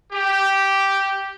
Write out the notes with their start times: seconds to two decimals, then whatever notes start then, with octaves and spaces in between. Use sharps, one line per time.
0.12 G4